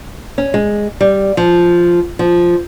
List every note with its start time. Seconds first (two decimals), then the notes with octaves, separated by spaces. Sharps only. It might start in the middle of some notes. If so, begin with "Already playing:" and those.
0.38 C#4
0.54 G#3
1.01 G3
1.37 F3
2.19 F3